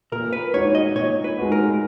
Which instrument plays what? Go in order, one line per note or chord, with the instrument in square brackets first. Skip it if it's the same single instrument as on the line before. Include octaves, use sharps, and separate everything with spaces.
[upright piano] A#2 [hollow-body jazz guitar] A#4
[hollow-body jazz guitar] B4
[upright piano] G#3 D#4 F#4 [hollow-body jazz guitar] C#5
[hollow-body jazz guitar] D#5
[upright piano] A#2 [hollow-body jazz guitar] C#5
[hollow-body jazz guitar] B4
[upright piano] G#3 D#4 F#4
[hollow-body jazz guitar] A#4